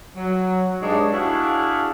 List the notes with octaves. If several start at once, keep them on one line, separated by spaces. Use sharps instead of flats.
F#3
G2 G#3 D4 D#4 C#5
D4 E4 F#4 G#4 F5